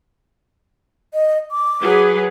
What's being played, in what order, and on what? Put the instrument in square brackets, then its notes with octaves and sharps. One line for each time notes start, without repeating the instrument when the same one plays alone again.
[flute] D#5
D6
[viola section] F#3 G#4 B4